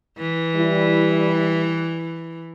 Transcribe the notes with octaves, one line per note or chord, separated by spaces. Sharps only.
E3
G3 E4